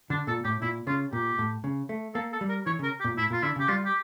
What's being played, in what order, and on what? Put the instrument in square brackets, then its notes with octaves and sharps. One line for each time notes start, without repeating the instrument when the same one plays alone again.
[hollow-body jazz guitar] D3 [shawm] D4
[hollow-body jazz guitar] A#2 [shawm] A4
[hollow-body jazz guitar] A2 [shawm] G4
[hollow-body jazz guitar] A#2 [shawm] E4
[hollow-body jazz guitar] C#3 [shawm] F4
[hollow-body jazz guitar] A#2 [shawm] G4
[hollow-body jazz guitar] A2
C#3
A3
[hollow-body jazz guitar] A#3 [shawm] A4
[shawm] A4
[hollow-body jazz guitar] G3
[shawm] A#4
[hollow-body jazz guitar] E3 [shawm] C#5
[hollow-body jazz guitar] C#3 [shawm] A#4
[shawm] G4
[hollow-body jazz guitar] A#2
[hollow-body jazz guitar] A2 [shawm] E4
[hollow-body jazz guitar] A#2 [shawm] F4
[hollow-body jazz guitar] D3 [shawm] E4
[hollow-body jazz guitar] C#3 [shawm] G4
[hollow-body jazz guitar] G3 [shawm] F4
[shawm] G4